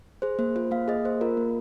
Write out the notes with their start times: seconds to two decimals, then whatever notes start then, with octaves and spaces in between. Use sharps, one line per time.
0.22 G#4 C5
0.39 A#3 C5
0.56 F4 C5
0.71 A#3 F5
0.88 G#4 D#5
1.04 A#3 C5
1.21 F4 A#4
1.37 A#3